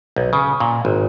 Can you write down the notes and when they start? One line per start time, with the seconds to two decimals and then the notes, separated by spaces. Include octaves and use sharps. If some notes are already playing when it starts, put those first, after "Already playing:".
0.16 B1
0.33 C#3
0.60 A#2
0.85 G#1